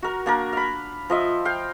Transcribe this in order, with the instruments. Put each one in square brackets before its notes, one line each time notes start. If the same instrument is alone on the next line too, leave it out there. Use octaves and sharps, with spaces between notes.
[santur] F#4 A#4
A#3 D4 A#4
F5 B5
F3 D#5 E5
F5 G5